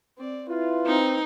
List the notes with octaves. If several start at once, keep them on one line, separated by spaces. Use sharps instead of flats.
C4 D5
E4 F4 B4
C4 D#4